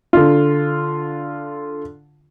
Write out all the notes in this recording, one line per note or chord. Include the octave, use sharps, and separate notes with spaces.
D3 F4